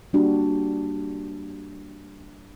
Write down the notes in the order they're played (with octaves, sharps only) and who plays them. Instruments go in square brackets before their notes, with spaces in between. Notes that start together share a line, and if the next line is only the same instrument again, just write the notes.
[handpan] G3 A#3 D4 F#4 G4